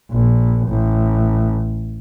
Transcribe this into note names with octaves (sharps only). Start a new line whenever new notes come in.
A#1
A1